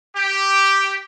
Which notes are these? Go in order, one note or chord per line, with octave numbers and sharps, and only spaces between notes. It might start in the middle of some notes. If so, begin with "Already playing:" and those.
G4